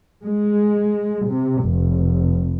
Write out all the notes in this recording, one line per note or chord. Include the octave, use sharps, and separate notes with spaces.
G#3
C3
F1